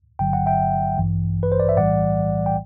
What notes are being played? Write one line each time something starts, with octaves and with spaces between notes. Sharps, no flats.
G1 G2 D3 F#3 G5
F#5
E5 G5
A1 G2 E3
B4
C5
D5
E5
B1 A2 E3 G3 D5 F#5
G5